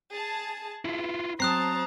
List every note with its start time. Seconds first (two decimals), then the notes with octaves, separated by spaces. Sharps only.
0.12 G#4 A5
0.85 E4 F4 B4
1.40 F#3 C4 C5 A5 A#5 D#6 F#6 C7